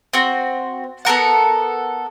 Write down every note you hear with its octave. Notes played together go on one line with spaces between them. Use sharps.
C4 F#4
B3 A4 A#4 F#5